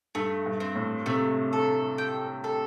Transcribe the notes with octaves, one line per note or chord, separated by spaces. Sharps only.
G2 A3
G2
C4
A2
C3 A3
A4
G5
A4